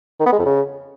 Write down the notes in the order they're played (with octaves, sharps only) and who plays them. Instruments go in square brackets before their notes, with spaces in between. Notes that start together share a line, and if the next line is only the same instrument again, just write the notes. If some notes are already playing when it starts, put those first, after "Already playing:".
[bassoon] D#3
B3
G#3
F2
C#3